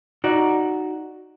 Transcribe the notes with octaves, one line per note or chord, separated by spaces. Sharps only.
D#4 F#4 D5